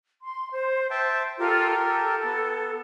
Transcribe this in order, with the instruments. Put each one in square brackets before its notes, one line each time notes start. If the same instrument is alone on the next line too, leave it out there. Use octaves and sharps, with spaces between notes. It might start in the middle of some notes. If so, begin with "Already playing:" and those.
[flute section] C6
C5
[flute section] C5 [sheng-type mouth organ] E5 G5 A5
[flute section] F4 A4 [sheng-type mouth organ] G4 A#4
[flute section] A4
[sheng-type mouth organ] B3